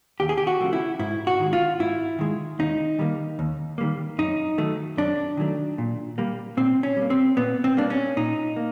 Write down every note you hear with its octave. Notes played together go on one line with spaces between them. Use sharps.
D#2 G4
G#4
G4
F#4
C#3 F3 A3
E4
G#2 E4
F#4
D#3 G#3
F4
G#2 E4
D#3 G#3
D#2 D#4
D#3 G3 A#3
D#2
D#3 G3 A#3
F#2 D#4
D#3 F#3 A3
F#2 D4
D#3 F#3 A3
A#2
G3 A#3
A#2 C4
C#4
G3 A#3
C4
A#2 B3
C4
G3 A#3 D4
C#4
A#2 D#4
A#3